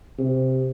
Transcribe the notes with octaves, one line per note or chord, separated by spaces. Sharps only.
C3